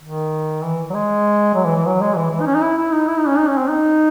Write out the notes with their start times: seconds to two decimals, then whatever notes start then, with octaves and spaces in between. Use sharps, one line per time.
0.03 D#3
0.63 E3
0.90 F#3
0.94 G#3
1.55 F#3
1.65 E3
1.76 E3
1.85 F#3
2.01 G#3
2.16 E3
2.31 E3
2.41 D#4
2.46 C#4
2.55 D#4
2.61 E4
2.77 E4
2.92 D#4
3.08 E4
3.18 D#4
3.27 C#4
3.38 D#4
3.48 C#4
3.58 C4
3.68 D#4